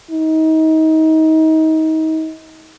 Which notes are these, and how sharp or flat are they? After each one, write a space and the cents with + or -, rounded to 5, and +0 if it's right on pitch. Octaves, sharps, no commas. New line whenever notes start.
D#4 +30